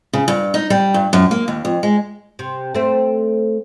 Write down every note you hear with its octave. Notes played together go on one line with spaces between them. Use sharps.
C#3
G2
D#4
G3
G2
F#2
A#3
D#2
F2
G#3
C3
A3 C4